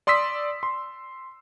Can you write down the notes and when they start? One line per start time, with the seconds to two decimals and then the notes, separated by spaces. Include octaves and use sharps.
0.07 D5 C6 D#6 E6 B6
0.63 C6